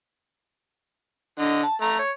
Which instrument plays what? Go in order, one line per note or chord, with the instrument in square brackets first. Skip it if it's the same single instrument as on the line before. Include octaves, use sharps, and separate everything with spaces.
[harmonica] D3 D#5
A5
A3 A#5
C#5